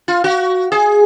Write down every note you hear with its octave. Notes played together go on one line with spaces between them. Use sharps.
F4
F#4
G#4